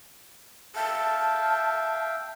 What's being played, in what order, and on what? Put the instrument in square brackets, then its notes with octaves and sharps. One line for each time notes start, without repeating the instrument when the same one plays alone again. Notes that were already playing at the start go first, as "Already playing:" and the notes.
[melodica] E5 F5 G5 [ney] A5